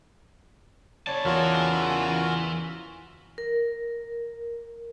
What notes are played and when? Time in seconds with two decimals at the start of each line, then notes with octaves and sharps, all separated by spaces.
1.07 C#3 C#5 D5 A5
1.25 E2 E3 F4 F#4 A#4
3.38 A#4